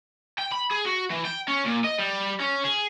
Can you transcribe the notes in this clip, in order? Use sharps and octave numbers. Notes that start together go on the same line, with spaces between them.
G5
B5
G#4
F#4
E3
G5
C#4
A#2
D#5
G3
C#4
G#4